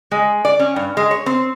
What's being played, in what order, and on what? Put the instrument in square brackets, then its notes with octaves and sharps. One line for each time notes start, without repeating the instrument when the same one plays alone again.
[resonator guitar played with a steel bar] G#3
D5
C#4
G2
G#3
C#5
C4